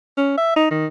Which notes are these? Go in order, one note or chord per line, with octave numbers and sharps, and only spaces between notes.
C#4
E5
D#4
D#3